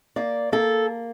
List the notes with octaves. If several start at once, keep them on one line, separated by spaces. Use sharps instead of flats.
A#3 D5
A#3 A4